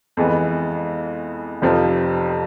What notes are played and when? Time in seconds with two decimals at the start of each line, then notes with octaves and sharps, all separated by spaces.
0.17 F2 E3 G#3 B3
1.62 F1 F2 C3 F3